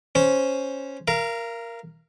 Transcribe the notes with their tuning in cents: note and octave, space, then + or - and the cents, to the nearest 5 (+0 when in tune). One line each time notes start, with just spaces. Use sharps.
C#4 +0 C5 -5
A#4 +0 F5 -30